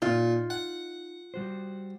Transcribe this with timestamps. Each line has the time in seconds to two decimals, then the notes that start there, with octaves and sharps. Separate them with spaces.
0.02 A#2 D#4 F4
0.50 F#5
1.34 G3 F#4 C5